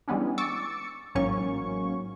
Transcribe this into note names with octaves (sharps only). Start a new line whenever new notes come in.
E3 G3 G#3 B3 C#4 D4
C#6 D6 E6 A6 C#7
A1 G#2 F#3 A#3 C#4 C#6